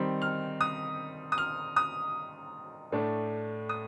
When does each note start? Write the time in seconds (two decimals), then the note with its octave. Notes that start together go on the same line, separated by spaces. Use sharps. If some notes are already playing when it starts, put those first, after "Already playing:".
Already playing: D#3 G3 C4 D#4
0.22 F6
0.61 D#6
1.32 D#6
1.38 F6
1.76 D#6
2.92 A2 A3 D4
3.69 D#6